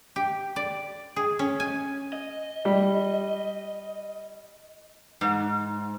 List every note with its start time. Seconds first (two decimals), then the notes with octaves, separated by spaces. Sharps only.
0.16 G4
0.56 D5
1.16 G#4
1.39 C#4
1.60 G#5
2.13 D#5
2.65 G3
5.21 G#2